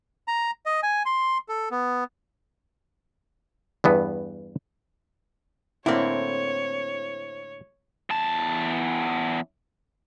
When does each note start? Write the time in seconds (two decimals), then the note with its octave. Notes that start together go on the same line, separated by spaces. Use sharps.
0.28 A#5
0.66 D#5
0.83 G#5
1.06 C6
1.49 A4
1.71 B3
3.84 E2 G2 B3
5.86 A2 D3 A#3 C4 E4 C#5
8.10 E2 A5